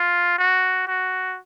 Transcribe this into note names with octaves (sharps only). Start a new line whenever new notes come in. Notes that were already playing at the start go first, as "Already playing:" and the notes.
Already playing: F4
F#4
F#4